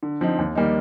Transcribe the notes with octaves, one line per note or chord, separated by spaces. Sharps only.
D3
F3 C4 D#4
D#2
D#3 G3 A#3 D#4